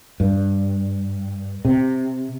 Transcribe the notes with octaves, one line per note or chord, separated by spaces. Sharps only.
G2
C3